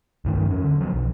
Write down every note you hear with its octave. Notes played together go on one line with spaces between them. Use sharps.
C2 G2 D#3 A3
F2 C#4
D3
F3 F#3 A3 B3
B1